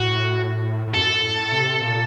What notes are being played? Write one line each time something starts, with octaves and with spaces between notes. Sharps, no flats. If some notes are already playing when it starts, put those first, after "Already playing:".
Already playing: A2 F#4
A2
F#2 A4
A2
C3
A#2